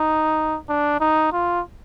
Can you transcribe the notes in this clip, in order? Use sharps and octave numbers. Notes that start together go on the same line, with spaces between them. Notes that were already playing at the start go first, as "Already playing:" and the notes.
Already playing: D#4
D4
D#4
F4